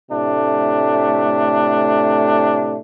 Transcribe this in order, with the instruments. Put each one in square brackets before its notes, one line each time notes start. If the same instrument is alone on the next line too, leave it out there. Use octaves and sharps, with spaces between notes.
[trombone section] A2 C3 A3 D4